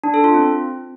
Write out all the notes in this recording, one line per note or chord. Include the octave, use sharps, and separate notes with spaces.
D4
A4
F4
C4